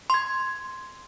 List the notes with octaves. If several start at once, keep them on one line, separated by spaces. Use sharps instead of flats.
C6 G#6